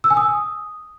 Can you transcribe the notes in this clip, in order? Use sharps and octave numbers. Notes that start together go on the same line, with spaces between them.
E6
G#5
D#6